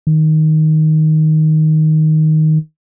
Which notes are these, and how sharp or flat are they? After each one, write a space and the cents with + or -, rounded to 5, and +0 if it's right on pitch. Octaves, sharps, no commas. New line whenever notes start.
D#3 +5